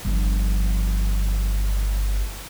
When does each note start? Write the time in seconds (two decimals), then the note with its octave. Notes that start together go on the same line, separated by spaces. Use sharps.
0.05 G1 F3